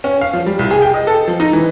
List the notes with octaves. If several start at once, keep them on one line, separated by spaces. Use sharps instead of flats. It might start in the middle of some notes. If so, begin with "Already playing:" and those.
C#4
F5
F3
G3
C2
G#4
G5
D#5
A4
F3
D#4
E3